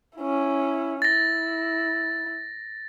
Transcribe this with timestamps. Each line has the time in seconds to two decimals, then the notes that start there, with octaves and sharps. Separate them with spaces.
0.17 C#4 E4
1.02 E4 A6 A#6